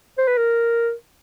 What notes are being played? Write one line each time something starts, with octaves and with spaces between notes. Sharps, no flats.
C5
B4
A#4